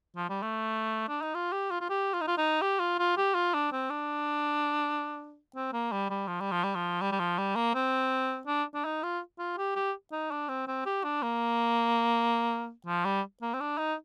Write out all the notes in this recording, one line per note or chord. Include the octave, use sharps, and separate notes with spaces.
F3
G3
A3
D4
D#4
F4
G4
F4
F4
G4
F4
D#4
F4
D#4
G4
F4
F4
G4
F4
D4
C4
D4
C4
A#3
G3
G3
F3
G3
F3
G3
F3
G3
G3
F3
G3
A#3
C4
D4
D4
D#4
F4
F4
G4
G4
D#4
D4
C4
C4
G4
D4
A#3
F3
G3
A#3
C4
D4
D#4